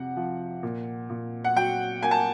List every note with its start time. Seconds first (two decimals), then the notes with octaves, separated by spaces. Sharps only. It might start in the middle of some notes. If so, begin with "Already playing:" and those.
Already playing: F2 C3 F#5
0.17 F3
0.63 A#2
1.10 A#2
1.45 F#5
1.56 F#3 G5
2.03 A#3 G#5
2.11 A5